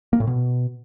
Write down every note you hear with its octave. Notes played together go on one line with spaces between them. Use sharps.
A#3
A2
B2